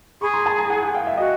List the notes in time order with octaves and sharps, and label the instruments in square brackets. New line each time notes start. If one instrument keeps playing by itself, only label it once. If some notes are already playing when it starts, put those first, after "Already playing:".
[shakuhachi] G#4 [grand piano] B5 C#6
[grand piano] A#5 C6
A5 B5
G#5 A#5
F#5 G#5
F#5 G#5
F5 G5
E5
[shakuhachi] F#4 [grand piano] D#5